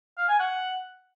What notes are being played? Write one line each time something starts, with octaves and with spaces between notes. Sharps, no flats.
F5
G#5
F#5